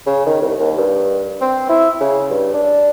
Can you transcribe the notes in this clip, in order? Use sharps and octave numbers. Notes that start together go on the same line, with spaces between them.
C#3
D#3
C2
D#2
G2
C4
E4
C#3
G2
D4